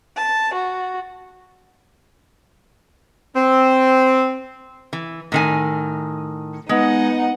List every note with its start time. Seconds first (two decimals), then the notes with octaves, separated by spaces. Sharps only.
0.17 A5
0.55 F#4
3.36 C4
4.93 E3
5.32 A2 D#3 G#5
6.69 G#3 B3 D#4 F#5